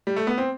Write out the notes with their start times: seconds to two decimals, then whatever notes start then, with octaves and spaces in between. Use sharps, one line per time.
0.07 G3
0.16 A3
0.27 B3
0.38 C4